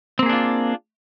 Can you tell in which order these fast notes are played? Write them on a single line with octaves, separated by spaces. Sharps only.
C4 A#3 G#4 D4 F4